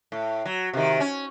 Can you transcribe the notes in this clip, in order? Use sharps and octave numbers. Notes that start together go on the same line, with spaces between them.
A2
F#3
C3 D#3
C#4